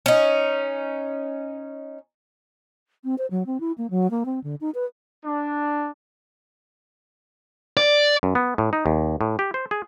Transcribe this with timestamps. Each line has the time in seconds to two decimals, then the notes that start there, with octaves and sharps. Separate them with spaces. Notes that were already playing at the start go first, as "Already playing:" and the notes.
0.06 C#4 D#4
3.04 C4
3.18 C5
3.31 F#3
3.46 C4
3.60 E4
3.78 A#3
3.90 F#3
4.11 A#3
4.26 C4
4.44 D3
4.61 D#4
4.75 B4
5.24 D4
7.77 D5
8.23 F#2
8.35 B3
8.58 A2
8.73 D#4
8.86 D#2
9.21 A2
9.39 G4
9.54 C5
9.71 G#4